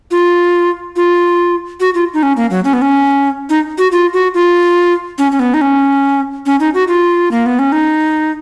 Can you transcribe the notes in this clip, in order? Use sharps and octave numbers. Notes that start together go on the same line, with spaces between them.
F4
F4
F#4
F4
D#4
C#4
A#3
F#3
C#4
B3
C#4
D#4
F#4
F4
F#4
F4
C#4
C#4
B3
D#4
C#4
C#4
D#4
F#4
F4
A#3
B3
C#4
D#4